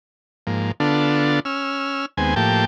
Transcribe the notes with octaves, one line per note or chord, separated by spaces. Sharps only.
G#2 F3 A#3
D3 B3 D4 F4 A4
C#4 E6 F6
D#2 G#3 B3 C4 G#5
A2 F3 A#3 G4 G5 A5